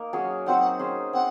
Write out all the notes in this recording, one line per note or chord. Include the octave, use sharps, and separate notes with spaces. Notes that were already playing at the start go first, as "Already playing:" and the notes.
Already playing: A#3 D#4 A#4
F#3 C#4 G#4
F#3 C4 D#4 F#5
C#4 G#4 C5
C4 F#5